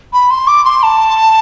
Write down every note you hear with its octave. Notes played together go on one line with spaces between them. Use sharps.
B5
C6
D6
C6
A5